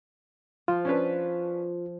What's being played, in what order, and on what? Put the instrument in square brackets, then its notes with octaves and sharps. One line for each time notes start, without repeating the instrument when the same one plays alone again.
[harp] F3 [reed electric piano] F4
[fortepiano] C#4 D4 B4